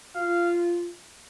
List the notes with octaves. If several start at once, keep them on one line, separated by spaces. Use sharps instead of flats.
F4 F5